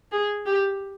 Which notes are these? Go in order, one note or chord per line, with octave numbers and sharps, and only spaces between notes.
G#4
G4